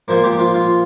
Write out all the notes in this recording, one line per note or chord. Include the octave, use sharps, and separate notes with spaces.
A#2 F3 A#3 C5
G4
F4
F4